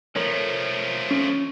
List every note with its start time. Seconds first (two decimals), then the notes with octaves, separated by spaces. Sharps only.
0.16 F3 A3 A4 A#4 C#5
1.11 C#4